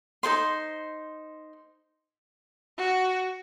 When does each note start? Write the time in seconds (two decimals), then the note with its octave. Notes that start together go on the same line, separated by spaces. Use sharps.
0.23 D#4 A4 C5 C6
2.78 F#4